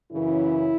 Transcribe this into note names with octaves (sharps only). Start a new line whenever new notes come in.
F#2 C#3 E3 E4